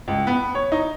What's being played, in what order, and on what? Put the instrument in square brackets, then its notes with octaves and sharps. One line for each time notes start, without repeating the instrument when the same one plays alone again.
[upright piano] C#2
B3
C#5
D#4